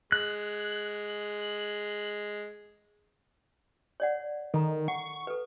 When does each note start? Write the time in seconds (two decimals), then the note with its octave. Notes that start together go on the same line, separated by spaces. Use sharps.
0.12 G#3 F#6
4.00 C#5 D5 F#5
4.54 D#3 A4 A#5
4.88 F#5 C#6
5.27 A4 B4